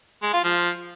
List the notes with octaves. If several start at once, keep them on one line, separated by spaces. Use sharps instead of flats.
G#3
F4
F3